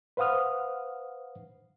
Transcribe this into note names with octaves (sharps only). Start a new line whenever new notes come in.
B4 C5 F5 F#5 D#6 F6